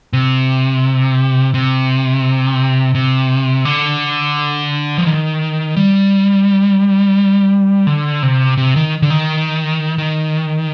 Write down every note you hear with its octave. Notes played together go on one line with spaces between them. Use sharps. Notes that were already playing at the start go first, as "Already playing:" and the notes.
C3
C3
C3
D3
F3
D#3
G3
D3
C3
C3
D#3
D3
D#3
D#3